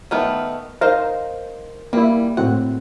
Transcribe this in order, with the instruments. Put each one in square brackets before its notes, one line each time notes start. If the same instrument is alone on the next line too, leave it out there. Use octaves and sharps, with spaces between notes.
[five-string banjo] D#3 A3 B3 [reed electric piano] F6
[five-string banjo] D#4 F5 [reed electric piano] A#4 [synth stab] C5
[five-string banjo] G3 [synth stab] A#3 E4
[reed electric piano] A2 C4 F#4 [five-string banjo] F#5